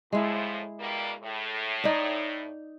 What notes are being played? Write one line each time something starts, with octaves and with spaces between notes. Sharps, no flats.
A2 F3 G#3 E4
B2 G3 A#3
A2
D#4 D5